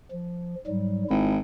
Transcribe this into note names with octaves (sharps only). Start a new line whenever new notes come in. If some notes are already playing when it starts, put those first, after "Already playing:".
F3
G#2 F#3 G3
G#1 E4